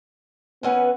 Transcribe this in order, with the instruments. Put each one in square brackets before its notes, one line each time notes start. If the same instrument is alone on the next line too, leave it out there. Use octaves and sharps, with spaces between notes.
[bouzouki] E3 C#4 F#5 [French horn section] B3